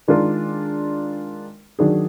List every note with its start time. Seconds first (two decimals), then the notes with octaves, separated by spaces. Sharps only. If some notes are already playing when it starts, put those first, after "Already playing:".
0.08 D#3 G#3 D4 F4 A#4
1.79 D#3 F#3 D4 G#4